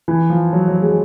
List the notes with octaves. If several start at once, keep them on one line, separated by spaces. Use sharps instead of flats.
E3
F3
F#3
F#3
G#3